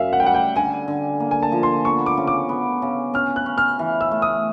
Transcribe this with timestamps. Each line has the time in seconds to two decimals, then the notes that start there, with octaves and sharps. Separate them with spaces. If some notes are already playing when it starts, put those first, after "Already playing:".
Already playing: F#2 E5 F5
0.13 F#5
0.20 G5
0.23 G3 F#5
0.34 G5
0.56 D3 G#5
0.88 D3
1.20 A#3
1.31 G#5
1.43 A5
1.52 F3
1.63 C6
1.85 B3 C#6
2.06 D6
2.17 C#3
2.27 D6
2.49 B3
2.82 C#3
3.14 C#4 F6
3.36 F#6
3.46 C#4
3.58 F6
3.79 E3
4.01 E6
4.11 A3
4.22 D#6